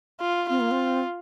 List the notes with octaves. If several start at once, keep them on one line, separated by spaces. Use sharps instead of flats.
F4
C4 F4
A#3
C4